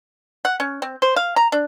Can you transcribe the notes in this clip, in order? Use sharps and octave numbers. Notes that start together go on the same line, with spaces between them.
F#5
C#4
C4
C5
F5
A#5
D4